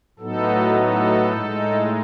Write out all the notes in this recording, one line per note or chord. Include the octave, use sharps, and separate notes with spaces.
A2 F#3 B3 D#4 A4
A4
A2 G#3 D#4